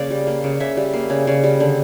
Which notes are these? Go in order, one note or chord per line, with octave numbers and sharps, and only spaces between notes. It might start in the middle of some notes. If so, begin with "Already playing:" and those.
Already playing: C#3 A#3 D5 F5
G3
A#3
C#3
C#3 E5
G3
A#3
C#3
C#3
G3
D3